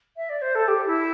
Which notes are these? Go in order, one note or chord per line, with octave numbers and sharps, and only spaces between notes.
E5
D5
C5
A4
G4
E4